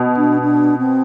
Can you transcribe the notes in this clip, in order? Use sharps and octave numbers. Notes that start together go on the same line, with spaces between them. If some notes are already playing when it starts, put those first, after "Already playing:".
Already playing: B2
D4
D4
C4